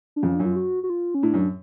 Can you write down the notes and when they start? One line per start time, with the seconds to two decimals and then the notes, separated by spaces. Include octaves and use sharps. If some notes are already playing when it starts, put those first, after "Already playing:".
0.16 D4
0.22 F2 C#4
0.35 F#2 D4
0.45 F4
0.56 F#4
0.83 F#4
0.90 F4
1.14 C#4
1.23 A2 D4
1.34 F#2